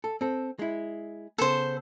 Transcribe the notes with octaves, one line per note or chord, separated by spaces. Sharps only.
A4
C4 A4
G#3 E4
C#3 B3 A4 C5